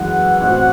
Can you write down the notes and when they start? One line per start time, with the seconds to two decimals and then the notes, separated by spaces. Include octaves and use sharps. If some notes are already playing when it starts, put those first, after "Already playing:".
Already playing: F#2 E3 G#3 F#5
0.41 A1 A2 F#3 C4